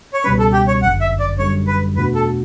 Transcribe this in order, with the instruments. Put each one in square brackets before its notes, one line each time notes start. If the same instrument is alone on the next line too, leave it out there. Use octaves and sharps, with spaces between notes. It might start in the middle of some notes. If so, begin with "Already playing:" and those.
[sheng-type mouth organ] C#5
[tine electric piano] C#2 B2 G3 C#4 [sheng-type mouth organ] B4
[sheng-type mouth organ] A4
G4
C#5
[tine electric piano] G1 F#2 D3 [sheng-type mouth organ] F#5
[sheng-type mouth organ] E5
D5
[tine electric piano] F#2 D3 G3 [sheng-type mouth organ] C#5
[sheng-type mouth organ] B4
[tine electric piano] E2 B2 A3 D4 F#4 [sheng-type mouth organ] B4
[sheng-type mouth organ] A4